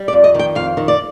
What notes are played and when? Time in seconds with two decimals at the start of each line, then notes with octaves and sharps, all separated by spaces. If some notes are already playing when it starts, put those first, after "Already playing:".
Already playing: G3
0.08 D5
0.13 F2
0.24 D#5
0.34 D#3 G5
0.55 F2 F5
0.77 D#3
0.88 D5